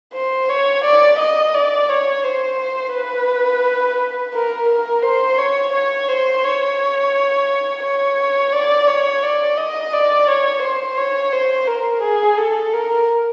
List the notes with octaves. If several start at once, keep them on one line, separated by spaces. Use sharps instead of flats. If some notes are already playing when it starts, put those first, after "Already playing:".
C5
C#5
D5
D#5
D5
C#5
C5
B4
A#4
A#4
C5
C#5
C#5
C5
C#5
C#5
D5
C#5
D5
D#5
D5
C#5
C5
C#5
C5
A#4
G#4
A4
A#4